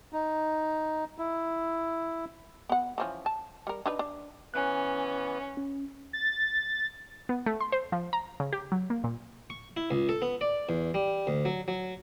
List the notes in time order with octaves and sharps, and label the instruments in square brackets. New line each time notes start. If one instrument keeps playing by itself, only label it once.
[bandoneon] D#4
E4
[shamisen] B3 F#5
E3 F3 C#4
A5
G3 A#4
D4 D#4 B4
D4
[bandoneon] E3 B3 [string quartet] C#4 [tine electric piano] G#5 F#6
[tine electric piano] C#4
[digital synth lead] A6
[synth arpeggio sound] B3
A3
C6
C5
F3
A#5
C#3
G4
F#3
A#3
A#2
[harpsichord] C#6
E4
C#2
A4
B3
D5
E2
G3
D2
F#3
F#3